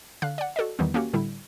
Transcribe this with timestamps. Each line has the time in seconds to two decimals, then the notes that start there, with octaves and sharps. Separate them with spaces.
0.22 D3 F5 F#6
0.38 D5 F#5
0.56 F#4 A4 D5 D#5
0.79 E2 D#3 E3 G3 B3
0.94 A#3 C#4 F#4 G4
1.13 A2 D3 G3 E4